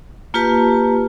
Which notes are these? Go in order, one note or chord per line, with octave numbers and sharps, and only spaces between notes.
A#3 F4 G4 B4 A5